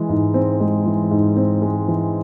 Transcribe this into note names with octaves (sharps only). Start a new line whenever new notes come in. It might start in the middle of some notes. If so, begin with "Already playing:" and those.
Already playing: E3 G#3
G#2
C4
G#3
E3
G#2
C4
G#3
E3